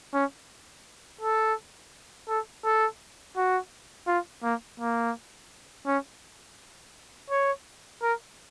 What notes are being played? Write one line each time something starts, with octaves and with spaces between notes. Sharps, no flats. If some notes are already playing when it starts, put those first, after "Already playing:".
C#4
A4
A4
A4
F#4
F4
A#3
A#3
C#4
C#5
A#4